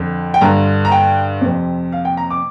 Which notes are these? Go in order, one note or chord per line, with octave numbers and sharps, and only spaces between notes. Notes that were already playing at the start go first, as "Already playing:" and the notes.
Already playing: F2 D3
G5
G2 D3 A#5
A#5
G5
F2 C3
F5
G5
A#5
D6